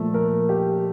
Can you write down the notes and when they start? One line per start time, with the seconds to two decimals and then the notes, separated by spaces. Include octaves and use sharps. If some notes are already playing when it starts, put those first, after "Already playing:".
Already playing: A#2 F3 A3
0.14 A#4
0.49 G4